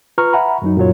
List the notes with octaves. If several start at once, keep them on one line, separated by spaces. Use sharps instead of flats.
F4 B4 A#5 C#6 F6
E5 F#5 G#5 A#5 B5
F#2 F#3 D#4
F#2 A#2 F#3 F4 C#5